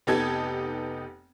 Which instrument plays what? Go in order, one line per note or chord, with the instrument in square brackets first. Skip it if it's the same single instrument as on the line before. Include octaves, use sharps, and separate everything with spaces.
[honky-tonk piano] F1 B3 D#4 G4 A4 G#6